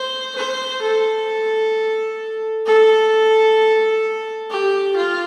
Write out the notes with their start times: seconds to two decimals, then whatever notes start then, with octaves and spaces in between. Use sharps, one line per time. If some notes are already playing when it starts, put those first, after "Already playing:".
Already playing: C5
0.35 C5
0.81 A4
2.66 A4
4.50 G4
4.96 F4